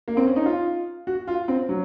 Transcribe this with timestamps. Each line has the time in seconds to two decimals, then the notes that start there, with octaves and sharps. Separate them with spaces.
0.08 A#3
0.17 C4
0.26 C#4
0.36 D#4
0.46 F4
1.07 F#4
1.28 F4
1.48 C4
1.69 F#3